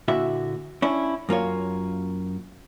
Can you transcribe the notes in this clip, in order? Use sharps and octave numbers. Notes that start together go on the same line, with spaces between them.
A#2 D3 E4 F#4 E5
C#4 D4 E4
F#2 A#3 F4 C#5